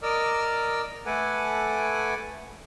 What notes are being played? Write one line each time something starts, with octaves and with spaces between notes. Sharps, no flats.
A#4 D5 D#5 D6 E6 F6
A3 A4 B4 F#5 G#5 D6